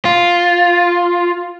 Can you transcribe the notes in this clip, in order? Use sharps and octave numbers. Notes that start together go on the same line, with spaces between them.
F4